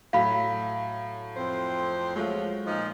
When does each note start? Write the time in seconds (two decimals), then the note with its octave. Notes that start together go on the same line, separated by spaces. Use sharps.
0.13 A2 F#3 F5 B5 B6
1.37 F2 C4 C5
2.16 F3 F#3 G#3 A3 F4
2.67 A#2 F3 D#4